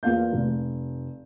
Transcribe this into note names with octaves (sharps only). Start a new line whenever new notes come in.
E2 A#3 F4 F5 G6
F1